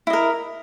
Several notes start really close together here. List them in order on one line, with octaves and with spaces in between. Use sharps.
E4 D#5 A#4